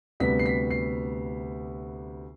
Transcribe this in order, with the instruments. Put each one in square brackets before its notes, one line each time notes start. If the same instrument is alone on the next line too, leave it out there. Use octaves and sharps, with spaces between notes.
[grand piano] D2 C3 G3 B3 B6
C7
B6
C7